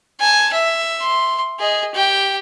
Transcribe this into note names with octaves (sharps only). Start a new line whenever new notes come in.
G#5 A5
E5
C6
G#4 D#5
G4 G5